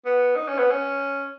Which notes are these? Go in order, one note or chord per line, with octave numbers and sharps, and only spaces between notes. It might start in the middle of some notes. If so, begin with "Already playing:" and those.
B3
D#4
C#4
B3
C#4